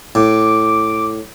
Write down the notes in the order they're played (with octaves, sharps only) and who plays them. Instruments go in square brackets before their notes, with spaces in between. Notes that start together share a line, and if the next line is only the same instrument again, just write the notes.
[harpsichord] A2 [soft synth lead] D6